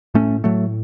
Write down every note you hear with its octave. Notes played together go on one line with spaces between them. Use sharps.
A2 A3 C#4
A2 F#3 A3